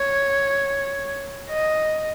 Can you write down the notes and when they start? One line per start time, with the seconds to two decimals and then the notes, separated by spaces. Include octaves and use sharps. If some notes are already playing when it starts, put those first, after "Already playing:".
Already playing: C#5
1.50 D#5